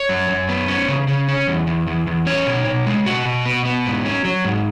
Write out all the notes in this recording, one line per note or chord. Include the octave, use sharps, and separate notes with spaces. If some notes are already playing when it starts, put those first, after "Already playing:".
Already playing: C#5
F#2
F#2
B3
C#4
C#3
C#3
C#4
E2
E2
E2
E2
C#4 C#5
B2
B2
G#3
B2 F#4
B2
B3
B3
G#2
C#4
F#3
G#2